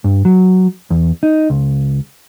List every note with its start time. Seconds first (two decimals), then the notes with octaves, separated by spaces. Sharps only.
0.04 G2
0.25 F#3
0.90 E2
1.23 D#4
1.50 C#2